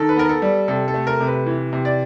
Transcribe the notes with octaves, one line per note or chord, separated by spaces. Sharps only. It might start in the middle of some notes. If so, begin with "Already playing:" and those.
Already playing: D#3 A4
B4
B3 A#4
A4
G3
C3 A4
A4
A3
A#4
C3
B4
E3
C3
D5